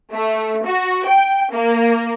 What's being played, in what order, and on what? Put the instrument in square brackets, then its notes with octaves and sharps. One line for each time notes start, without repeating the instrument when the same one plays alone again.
[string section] A3
F#4
G5
A#3